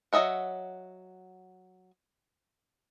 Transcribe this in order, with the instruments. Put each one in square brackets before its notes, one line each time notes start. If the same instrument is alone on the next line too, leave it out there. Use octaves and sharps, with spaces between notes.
[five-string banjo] F#3 G#4 D#5 E5 F#5